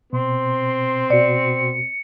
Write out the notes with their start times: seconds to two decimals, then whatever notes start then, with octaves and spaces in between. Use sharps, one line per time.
0.13 B2 C4 C6
1.10 B2 F#4 D5 C#7